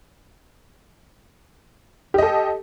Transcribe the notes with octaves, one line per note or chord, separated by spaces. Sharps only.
G4 A4 D#5